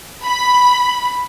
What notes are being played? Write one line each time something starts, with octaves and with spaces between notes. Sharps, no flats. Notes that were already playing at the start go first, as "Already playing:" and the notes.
B5